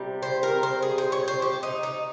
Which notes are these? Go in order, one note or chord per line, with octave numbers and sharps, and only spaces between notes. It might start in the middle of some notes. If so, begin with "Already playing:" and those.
Already playing: C3 G3
C5
A#4
C5
G#4
C5
C#5
C5
G4
D#4
D#4